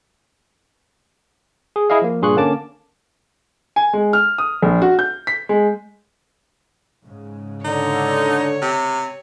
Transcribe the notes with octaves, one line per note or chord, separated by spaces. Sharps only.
G#4
E4 G#4 D#5 F5
F3 A#3
G2 A#2 G#4 C6 C#6 F#6
D3 A#3 C#4 A5 D6
G#5
G#3
F6
D#6
A#1
F#4
G6
B6
G#3
G#2 C#3
D3 D#4 C#5
C3